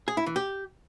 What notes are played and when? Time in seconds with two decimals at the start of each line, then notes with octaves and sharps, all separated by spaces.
0.08 G#4
0.17 E4
0.26 E3
0.36 G4